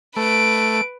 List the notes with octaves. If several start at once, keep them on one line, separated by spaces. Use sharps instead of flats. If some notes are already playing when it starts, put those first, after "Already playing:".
A3 B4 D7